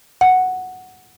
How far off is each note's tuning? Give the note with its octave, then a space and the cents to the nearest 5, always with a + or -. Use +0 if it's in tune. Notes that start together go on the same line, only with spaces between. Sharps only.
F#5 +0